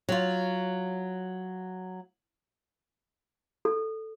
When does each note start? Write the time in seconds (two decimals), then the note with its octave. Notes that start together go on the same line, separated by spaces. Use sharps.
0.09 F#3 F4
3.65 A4